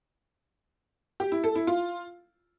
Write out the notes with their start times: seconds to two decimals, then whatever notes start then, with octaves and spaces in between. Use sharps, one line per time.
1.20 G4
1.32 E4
1.44 A4
1.55 E4
1.67 F4